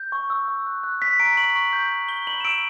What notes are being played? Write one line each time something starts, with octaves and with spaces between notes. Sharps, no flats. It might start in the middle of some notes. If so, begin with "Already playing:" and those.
Already playing: G6
C#6
E6
C#6
F#6
F#6
F#6 B6
A#5 D7
C#6 F#7
C#6
G6
G6
G6 G7
B5 F#7
E7
E6 D7